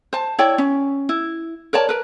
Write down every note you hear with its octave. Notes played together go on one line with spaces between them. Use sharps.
C5 A5
E4 C#5 D5 G5
C#4
E4
A#4 C#5 D5 A5
A#4 B4